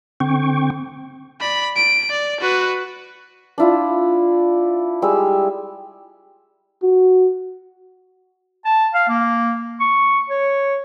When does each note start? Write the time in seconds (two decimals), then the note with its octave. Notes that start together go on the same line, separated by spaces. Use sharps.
0.20 D3 C4 G5 C#6
1.40 D5 B5
1.76 D7
2.10 D5
2.40 F#4 B4
3.58 D4 E4 F4
5.02 G3 G#3 E6
6.83 F#4
8.65 A5
8.94 F5
9.09 A#3
9.80 C#6
10.30 C#5